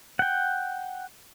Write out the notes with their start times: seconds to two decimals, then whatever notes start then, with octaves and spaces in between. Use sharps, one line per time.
0.19 F#5 G5